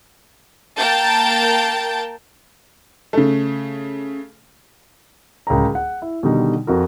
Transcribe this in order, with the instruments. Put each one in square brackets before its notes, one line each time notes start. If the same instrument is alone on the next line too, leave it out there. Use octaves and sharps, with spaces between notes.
[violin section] A#3 A#4 G5 A5 G6 A6
[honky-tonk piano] C#3 A3
[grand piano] D1 C#2 A#4 G5 A#5
F#5
E4
B2 D3 D#3 G3 D#4
F2 F#4 A#4